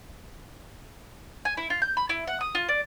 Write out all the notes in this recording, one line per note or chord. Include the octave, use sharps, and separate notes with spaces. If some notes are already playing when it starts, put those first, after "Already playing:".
G#5
E4
F4
G6
B5
E4
F#5
D#6
F4
D5